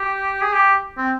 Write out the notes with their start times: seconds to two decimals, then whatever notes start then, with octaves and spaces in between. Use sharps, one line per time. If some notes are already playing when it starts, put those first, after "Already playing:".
Already playing: G4
0.42 G#4
0.53 G4
0.97 C4